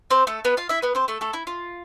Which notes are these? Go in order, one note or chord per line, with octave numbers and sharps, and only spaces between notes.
C4 C5
A3 A4
B3 B4
F4 F5
E4 E5
B3 B4
C4 C5
A3 A4
A3 A4
E4
F4